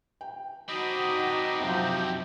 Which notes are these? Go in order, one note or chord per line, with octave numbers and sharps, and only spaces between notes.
G5
C4 D4 D#4 F#4 D#5 B5 D6
F#2 C3 F3 G4